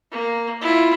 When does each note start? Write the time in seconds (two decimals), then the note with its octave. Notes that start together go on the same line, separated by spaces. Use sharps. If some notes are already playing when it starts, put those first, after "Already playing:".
0.11 A#3
0.61 E4 F4